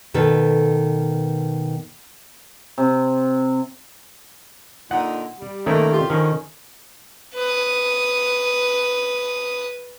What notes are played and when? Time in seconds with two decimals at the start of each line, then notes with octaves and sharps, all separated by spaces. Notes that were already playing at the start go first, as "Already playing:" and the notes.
0.14 B2 D#3 A4 B4
2.78 C3
4.91 A#2 D3 D#4 F#5
5.40 G3
5.66 D#3 A3 A#3 C#4 D#4
5.92 F4 G4
6.10 D3 D#3 F3 C#4
7.35 B4 D#6